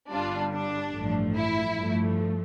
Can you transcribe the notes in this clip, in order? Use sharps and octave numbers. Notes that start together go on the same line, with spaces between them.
G1 G2 D3 G3 D4 F4
D4
A1 G2 F3 A3
E4
G2 F3 A3